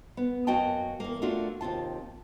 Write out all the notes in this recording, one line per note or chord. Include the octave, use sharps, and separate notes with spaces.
B3
F#2 A#3 F#4 D#5 G5 A5
E2 A#3
A3 A#3 D4 F4 F#4
D#2 C3 F4 A5